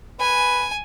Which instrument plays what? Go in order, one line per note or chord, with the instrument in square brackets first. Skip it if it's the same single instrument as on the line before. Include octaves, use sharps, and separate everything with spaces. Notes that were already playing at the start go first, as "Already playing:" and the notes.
[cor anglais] B4 [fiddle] G#5